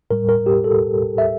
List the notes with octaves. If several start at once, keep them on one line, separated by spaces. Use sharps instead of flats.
A2 G3 A#4
A#4
G4
A4
E5